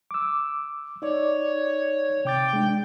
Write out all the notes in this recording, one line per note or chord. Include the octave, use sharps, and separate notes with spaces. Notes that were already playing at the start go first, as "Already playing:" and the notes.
D6 E6
D#4 C#5 D5
C3 G5 D6 A6
G#3 D4